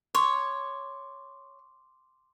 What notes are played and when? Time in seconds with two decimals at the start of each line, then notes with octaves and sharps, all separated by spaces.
0.15 C#5 C6 D6